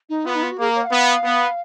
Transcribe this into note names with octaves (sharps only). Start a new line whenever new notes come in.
D#4
B3 F4
D#4
F4
F#4
A#3 G#4
C#5
F#5
B3 F5
B3